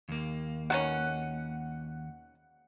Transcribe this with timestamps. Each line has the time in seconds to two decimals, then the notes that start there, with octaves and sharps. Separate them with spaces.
0.09 D#2 A#3
0.70 B2 D#3 C#4 F#5